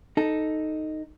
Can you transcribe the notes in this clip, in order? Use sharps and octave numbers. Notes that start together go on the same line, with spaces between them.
D#4 A4